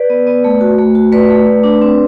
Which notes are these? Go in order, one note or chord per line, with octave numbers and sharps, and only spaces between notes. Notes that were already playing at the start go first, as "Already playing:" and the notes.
Already playing: B4 D5
B3
B3
A3
F#4
A3
F#4
A3 B4 D5
A3
A3
D4
C4